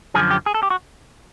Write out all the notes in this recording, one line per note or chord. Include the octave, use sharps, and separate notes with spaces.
F#2 D3 F3 G#4
G4
G#4
A4
G4
F#4